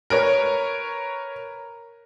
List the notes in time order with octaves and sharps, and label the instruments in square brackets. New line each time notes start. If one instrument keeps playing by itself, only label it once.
[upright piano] A#4 B4 C#5